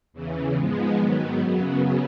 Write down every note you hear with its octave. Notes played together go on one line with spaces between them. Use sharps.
E2 C#3 E3
G#2 F3 G#3 B3
G#2 D#3 F#3 B3
F#2 C#3 F#3 B3